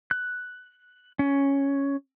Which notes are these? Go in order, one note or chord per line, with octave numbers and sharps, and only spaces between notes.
F#6
C#4